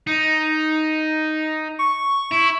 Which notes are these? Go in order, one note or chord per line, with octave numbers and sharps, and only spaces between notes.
D#4
C#6
E4